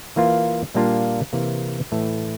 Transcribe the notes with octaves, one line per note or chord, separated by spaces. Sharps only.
E3 A#3 F4
A#2 G3 A#3 D4 F4
C3 E3 A#3
A2 E3 A3